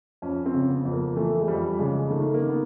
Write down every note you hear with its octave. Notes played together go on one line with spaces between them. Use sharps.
F2 C#4
C4
C#3
B3
F2
A#3
E3 A3
G#3
F2 G3
C#3 G#3
D#3 A3
A#3
D#3
B3